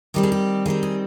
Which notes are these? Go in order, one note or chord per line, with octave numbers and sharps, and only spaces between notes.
D#3 G3 C4 G4
G#4
G4
D#3 G3 C4 G#4
G#4